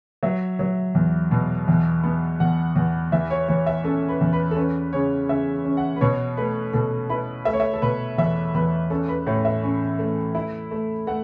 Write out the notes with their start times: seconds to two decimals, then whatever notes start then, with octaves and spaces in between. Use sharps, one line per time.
0.23 F#3 E5
0.59 F#3
0.95 E2
1.31 B2
1.68 E2
2.03 B3
2.40 E2 F#5
2.76 E2
3.12 E3 E5
3.31 C#5
3.48 E3 C#5
3.66 E5
3.84 C#4 A4
4.09 B4
4.21 E2
4.33 B4
4.51 A4
4.56 C#4 B4
4.93 C#3 C#5
5.29 C#3 E5
5.65 C#4
5.77 F#5
5.96 B4
6.01 B2 C#5
6.37 A3 B4
6.73 B2 A4
7.09 E4 B4
7.45 A3 E5
7.53 C#5
7.60 E5
7.74 A4
7.82 B2 B4
8.18 E2 E5
8.54 E2 B4
8.90 C#4 A4
9.08 B4
9.27 A2 C#5
9.45 E5
9.63 C#4
9.99 A3
10.35 E4
10.71 A3
11.07 A3 F#5